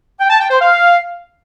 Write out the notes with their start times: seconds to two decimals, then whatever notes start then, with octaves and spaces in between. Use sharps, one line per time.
0.20 G5
0.30 A5
0.40 G5
0.50 C5
0.61 F5